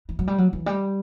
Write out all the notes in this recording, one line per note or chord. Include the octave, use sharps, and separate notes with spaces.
E3
F#3
G3
F#3
E3
G3